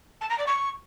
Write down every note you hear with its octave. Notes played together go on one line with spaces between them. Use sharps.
A5
A#5
D5
C#6